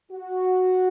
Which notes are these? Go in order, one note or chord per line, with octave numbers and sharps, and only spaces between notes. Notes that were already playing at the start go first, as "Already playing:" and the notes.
F#4